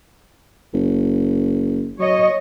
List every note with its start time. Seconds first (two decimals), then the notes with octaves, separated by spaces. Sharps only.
0.74 F#1
1.99 F#3 C#5 D#5